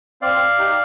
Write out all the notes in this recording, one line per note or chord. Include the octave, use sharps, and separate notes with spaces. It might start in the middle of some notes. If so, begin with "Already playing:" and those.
C4 D5 F5
D#4 G4